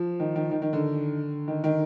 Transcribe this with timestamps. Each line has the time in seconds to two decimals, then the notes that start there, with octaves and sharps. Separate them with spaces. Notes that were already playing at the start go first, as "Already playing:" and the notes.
Already playing: F3
0.20 D#3
0.36 D#3
0.51 D#3
0.62 D#3
0.73 D3
1.48 D#3
1.64 D#3